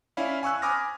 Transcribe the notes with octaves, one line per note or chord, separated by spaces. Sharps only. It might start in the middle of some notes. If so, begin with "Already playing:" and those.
C#4 E4 D5 F5 B5
G#5 C#6 E6 F#6
G#5 B5 D6 D#6 F6 A#6